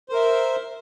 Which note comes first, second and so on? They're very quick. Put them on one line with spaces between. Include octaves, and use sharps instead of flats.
C5 A#4 E5